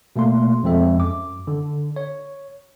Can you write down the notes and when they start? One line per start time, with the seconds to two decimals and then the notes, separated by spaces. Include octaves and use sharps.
0.16 B2 A3 A#3 C6
0.63 F2 F3 G#3 C4 A4 E5
0.98 F#2 D6
1.47 D3
1.96 C#5